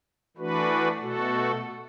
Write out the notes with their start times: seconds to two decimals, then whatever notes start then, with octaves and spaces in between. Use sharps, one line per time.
0.37 E3 A3 D4 F#4 B4
1.00 B2 A3 F#4 A4